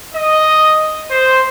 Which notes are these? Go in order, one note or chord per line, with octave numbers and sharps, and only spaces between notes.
D#5
C5